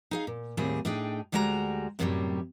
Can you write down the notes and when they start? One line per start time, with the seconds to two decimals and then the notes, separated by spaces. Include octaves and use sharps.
0.11 D#4 G#4 F5
0.27 A#2
0.57 D#2 A2 G3 C4 G#4
0.85 A2 D4 D#4 G#4 G5
1.32 D2 G3 G#3 F#4 G4 A#5
1.99 F#2 A2 C3 D#3 F#3 G3